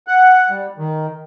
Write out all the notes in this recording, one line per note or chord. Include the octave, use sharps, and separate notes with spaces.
F#5
G3
D#3